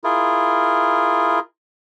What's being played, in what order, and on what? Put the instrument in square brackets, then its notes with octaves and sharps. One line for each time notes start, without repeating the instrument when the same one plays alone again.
[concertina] E4 F4 G#4 A#4